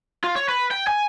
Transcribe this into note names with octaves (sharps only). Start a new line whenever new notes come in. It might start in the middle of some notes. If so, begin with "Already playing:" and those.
F4
C#5
B4
G5
G#5